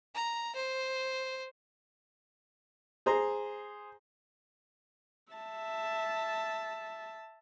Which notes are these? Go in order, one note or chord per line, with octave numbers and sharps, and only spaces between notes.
A#5
C5
G#4 C5 A#5
E5 A5